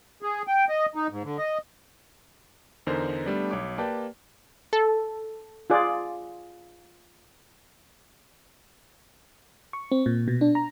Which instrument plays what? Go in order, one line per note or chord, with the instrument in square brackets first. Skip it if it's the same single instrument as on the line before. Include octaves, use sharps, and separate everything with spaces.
[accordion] G#4
G5
D#5
D#4
G#2
D3
D#5
[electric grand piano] E2 D3 D#4 A#4 C5
G3 A3 B3 D4
B1 C#5 D6
A#3 G4 B4 D5 G5 A5
[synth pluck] A4
[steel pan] F4 G#4 D5
[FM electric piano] C#6
C4
A#2
B2
D4
A#5